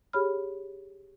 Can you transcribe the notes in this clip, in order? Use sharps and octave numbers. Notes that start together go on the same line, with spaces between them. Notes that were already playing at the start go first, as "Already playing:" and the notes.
G4 G#4 C#5 B5 F6